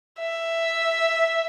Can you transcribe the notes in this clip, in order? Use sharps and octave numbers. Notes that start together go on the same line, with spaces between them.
E5